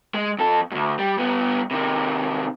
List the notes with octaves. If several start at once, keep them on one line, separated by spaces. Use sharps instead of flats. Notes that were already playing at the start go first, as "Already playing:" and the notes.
G#3
F2 A4
D2 G2
G3
G2 B3
C3 D#3